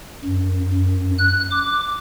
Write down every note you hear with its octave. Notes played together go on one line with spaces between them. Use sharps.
F#2
F#2
F#6
D6